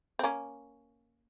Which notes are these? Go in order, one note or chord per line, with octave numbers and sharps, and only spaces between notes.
C4
A#3 C#4